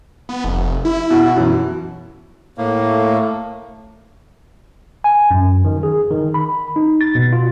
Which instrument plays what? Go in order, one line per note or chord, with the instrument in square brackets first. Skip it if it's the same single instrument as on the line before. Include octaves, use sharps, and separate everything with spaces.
[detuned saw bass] B3
F1
E4
[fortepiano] B2 F#4
F#2 B2 E3
[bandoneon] A2 A#3
[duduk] A3
[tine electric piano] G#5
F#2
D#3
G#4
D#3
B5
D#4
A6
B2
F4